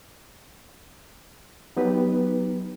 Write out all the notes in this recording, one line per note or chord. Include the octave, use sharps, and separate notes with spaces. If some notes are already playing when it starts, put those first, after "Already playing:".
F#3 B3 D#4 G4 B4